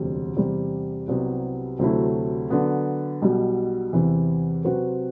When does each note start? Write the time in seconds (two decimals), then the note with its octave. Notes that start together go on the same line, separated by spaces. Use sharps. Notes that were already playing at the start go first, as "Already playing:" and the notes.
Already playing: E1 D2 C3 G3
0.36 E2 C3 G3
1.08 C2 C3 F#3 B3
1.79 D2 C3 F#3 A3 E4
2.50 D3 F#3 B3
3.22 B1 B2 G3
3.93 E2 C3 E3
4.64 C3 F#3 C4 F#4 B4